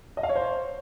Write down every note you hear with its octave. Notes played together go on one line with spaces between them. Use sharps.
D#5
F5
C#5
C5